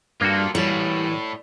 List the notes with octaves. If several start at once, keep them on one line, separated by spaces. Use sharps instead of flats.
G2 A#3 F4 F#4 A4
A2 E3 G3 C#5